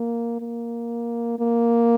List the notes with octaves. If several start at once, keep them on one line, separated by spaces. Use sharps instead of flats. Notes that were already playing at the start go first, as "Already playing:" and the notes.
Already playing: A#3
A#3
A#3